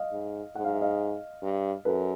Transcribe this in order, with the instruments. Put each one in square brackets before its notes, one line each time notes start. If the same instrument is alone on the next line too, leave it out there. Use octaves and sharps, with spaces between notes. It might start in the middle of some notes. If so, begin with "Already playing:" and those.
Already playing: [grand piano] D#5 F5
[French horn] G#2
[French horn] G#2 [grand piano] F#5
[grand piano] F5
E5
D#5 F5
[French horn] G2
[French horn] F#2 [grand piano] A4 B4